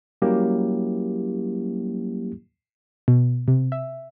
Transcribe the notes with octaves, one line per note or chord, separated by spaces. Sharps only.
F#3 G3 A#3 C#4 E4 G4
B2
C3
E5